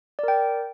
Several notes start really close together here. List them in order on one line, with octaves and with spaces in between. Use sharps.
D5 A#4 G5